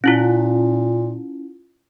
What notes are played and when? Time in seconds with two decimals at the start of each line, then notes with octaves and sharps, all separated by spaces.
0.04 A#2 C#4 E4 F4